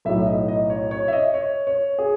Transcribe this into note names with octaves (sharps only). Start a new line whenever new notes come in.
B1 A2 F#3 E5
D#5
D#5
C#5
C#5
E5
D#5
C#5
C#5
G#4